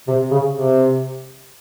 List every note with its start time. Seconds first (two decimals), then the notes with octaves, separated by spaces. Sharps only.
0.08 C3
0.31 C#3
0.56 C3